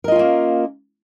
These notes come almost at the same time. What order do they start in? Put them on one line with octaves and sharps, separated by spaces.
A#4 D#5 F4 C#4 A#3